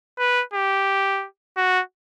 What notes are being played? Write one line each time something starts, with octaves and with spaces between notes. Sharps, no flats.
B4
G4
F#4